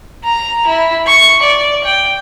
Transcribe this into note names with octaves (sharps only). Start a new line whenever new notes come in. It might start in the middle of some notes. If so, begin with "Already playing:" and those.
A#5
E4
C#6
D5
G5